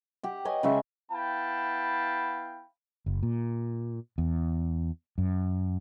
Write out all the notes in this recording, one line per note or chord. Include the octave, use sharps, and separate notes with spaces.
G4 F#5
B4 C#5 D#5 G#5
C#3 G#3 E5 C#6
B3 E4 F5 G5 A5 B5
F#1
A#2
E2
F#2